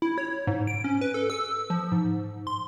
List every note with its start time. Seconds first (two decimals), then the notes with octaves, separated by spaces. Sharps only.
0.02 E4
0.18 C#5
0.47 G#2
0.67 D7
0.84 C#4
1.01 B4
1.14 A4
1.30 E6
1.70 F3
1.92 G#2
2.47 C6